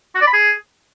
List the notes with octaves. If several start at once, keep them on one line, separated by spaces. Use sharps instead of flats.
F#4
D5
B5
G#4